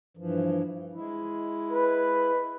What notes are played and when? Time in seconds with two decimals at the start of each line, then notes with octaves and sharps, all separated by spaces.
0.17 G2 E3 F3
0.93 G#3 E4
1.72 B4